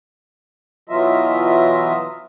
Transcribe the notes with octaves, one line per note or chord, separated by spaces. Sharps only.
B2 E3 F#3 F4 D#5 E5